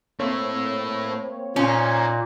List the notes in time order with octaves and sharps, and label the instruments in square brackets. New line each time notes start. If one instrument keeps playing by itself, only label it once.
[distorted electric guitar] A3 E4 [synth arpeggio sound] A#3 C4 C#5
[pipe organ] A#2 [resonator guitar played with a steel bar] C#4 [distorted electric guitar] D#4 C5